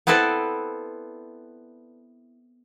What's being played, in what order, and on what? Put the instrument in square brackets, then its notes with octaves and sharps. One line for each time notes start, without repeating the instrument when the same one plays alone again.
[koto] B3 C4 E4 A4 B4 D5